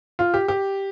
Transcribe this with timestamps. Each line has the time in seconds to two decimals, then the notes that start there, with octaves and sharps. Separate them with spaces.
0.19 F4
0.34 G4
0.48 G4